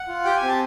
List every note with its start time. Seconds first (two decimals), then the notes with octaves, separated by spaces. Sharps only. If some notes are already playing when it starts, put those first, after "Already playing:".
Already playing: F#5
0.08 F4
0.25 G4 G5
0.36 G#5
0.43 C4
0.48 A5